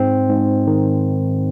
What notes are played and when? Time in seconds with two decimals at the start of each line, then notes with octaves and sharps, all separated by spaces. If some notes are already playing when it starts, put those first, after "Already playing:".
Already playing: G#2 C4
0.29 G#2
0.67 D#3